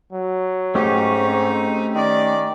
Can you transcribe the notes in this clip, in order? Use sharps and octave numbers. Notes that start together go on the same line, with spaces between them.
F#3
G#2 A3 C#4 D#4 G4
C4
D#3 D5